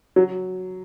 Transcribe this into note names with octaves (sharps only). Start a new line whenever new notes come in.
F#3